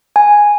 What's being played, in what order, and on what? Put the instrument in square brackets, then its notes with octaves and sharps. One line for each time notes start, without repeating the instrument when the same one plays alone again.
[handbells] G#5